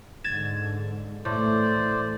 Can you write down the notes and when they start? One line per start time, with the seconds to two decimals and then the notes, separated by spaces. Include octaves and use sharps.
0.24 G#2 D3 G#6 A6 E7
1.25 A2 E3 A3 C5 D5